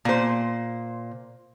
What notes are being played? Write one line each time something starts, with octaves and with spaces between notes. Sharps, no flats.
A#2 C5